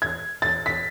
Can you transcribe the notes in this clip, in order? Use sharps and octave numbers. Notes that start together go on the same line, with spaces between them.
G#6
A6
B6